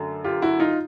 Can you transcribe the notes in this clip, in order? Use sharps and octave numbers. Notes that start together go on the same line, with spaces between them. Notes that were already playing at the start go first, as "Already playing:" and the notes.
Already playing: F#2 D3 F#3 A3
F4 G4
E4 F#4
D#4 F4